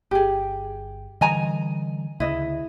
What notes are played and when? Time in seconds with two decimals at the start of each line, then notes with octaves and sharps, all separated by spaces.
0.11 G1 G4 G#4
1.21 D3 E3 G3 D#5 G#5 A#5
2.20 D2 C#3 E4 D#5